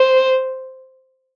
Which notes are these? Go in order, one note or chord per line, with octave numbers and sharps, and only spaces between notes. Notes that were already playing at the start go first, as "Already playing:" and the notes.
Already playing: C5